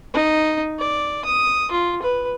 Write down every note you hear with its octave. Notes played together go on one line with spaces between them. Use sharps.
D#4
D5
D#6
F4
B4